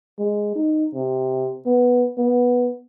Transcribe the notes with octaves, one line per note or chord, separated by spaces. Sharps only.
G#3
D#4
C3
B3
B3